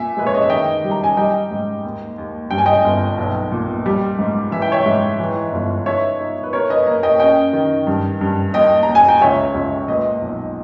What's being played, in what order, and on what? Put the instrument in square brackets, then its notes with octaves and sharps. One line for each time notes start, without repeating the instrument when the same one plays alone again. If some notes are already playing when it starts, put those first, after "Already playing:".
Already playing: [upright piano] A#2 E5 G#5
G#3 B4
C#5
D#5
E5
D#3 D#5 G5
G3
A#5
G#5
G3 D#5 G5
G#2
D#2
D#2
G2 G5
G#5
D#5 G5
G1
B1
A#2
G3
G#2
E3 E5
G5
C#5 E5
G#2
E3
G1
D#4 C#5 E5
D#4
B4
A#3 A#4 C#5
B4 D#5
A#3
D#5 G5
C#4 D#5 G5
D#3
G2
G2
D#2 D#5 G5
D#2 A#5
G#5
G5
C#2 C#5 E5
C#2
A#2 B4 D#5
B1